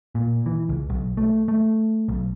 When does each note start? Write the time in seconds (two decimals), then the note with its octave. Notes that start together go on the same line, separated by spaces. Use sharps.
0.15 A#2
0.46 E3
0.69 C#2
0.89 B1
1.17 A3
1.48 A3
2.09 B1